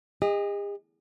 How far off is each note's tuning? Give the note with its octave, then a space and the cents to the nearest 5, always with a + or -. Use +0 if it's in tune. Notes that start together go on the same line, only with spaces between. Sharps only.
G#4 -45 D#5 +0